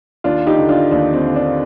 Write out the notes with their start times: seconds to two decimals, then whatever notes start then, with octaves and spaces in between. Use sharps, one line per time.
0.24 D#2 D4 F4
0.47 D#4 G4
0.58 D3
0.69 D4 F4
0.91 D#2 D4
1.14 C4
1.25 D3
1.36 D4